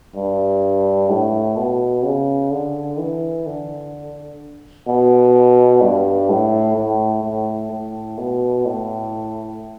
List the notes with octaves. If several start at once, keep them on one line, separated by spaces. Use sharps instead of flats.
G2
A2
B2
C#3
D3
E3
D3
B2
G2
A2
A2
A2
A2
B2
A2